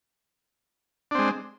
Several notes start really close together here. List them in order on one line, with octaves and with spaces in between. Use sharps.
D4 C4 G#3